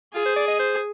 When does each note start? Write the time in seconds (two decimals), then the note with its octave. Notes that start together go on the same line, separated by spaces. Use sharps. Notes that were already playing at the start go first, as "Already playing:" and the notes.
0.14 F4 G#4
0.26 C5
0.36 D5
0.48 D#5
0.59 C5